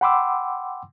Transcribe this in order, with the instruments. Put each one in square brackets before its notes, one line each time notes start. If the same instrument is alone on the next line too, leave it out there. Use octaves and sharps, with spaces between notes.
[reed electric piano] F#5 G5 B5 C6 D6 E6